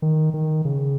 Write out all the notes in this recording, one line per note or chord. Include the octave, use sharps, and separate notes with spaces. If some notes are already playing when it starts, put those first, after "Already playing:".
D#3
D#3
C#3